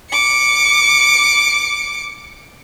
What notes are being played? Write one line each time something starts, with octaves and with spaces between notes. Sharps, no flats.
D6 C#7